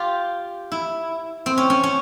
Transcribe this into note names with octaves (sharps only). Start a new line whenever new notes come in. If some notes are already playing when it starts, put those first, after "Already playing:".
Already playing: F4 G4
E4
C4
C#4
C#4
C#4